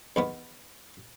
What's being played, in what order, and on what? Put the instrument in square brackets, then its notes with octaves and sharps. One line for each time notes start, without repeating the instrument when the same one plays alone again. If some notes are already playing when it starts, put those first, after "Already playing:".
[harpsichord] E2 D#3 B3